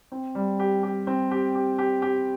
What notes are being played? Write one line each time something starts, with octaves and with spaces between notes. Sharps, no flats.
C4
G3
G4
G4
C4
G4
G4
G4
G4